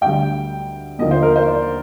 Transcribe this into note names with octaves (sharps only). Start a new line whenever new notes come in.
D2 D3 G3 G5
D#2 D3 F3 A#3 D#5
C5
A#4
C5
D5